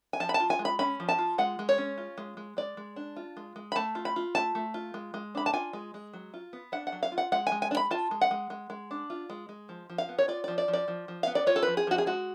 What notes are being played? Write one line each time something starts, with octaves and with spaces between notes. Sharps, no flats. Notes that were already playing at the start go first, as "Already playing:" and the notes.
G#5
F3 A5
B5
A5
F4
G#5
G#3
B5
C#4 B5
F3
A5
F4
G#3 F#5
G#3
C#5
C#4
F4
G#3
G#3
G#3 D5
G#3
D4
F4
G#3
G#3
B5
A3 A5
F4
B5
F4
A3 A5
A3
F4
G#3
G#3
D4 B5
A5
F4 G#5
G#3
G#3
F#3
F4
B3
D4 F#5
F#5
F#3
F5
F4
F#5
G#3 F#5
G#5
G#3
G#5
D4
B5
F4 A5
G#3
F#5
G#3
G#3
G#3
D4
F4
G#3
G#3
F3
F3
F5
B3
C#5
F4 D5
F3 D5
D5
F3
D5
F3
F3
B3 F5
D5
F4 C#5
A4
F3 B4
G#4
F3 F#4
G#4
G#3 F#4